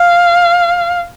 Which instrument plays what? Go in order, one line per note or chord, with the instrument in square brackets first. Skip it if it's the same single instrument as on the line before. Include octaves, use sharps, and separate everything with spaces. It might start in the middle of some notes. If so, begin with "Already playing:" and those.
Already playing: [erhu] F5